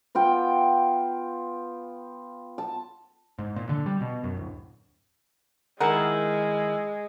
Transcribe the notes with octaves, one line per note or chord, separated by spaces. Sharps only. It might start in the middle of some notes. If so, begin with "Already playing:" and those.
B3 F4 G5
A5
G#2
A#2
D3
G3
B2
F#2
D1
D#3 G#3 E4 G#4 A#4 F#5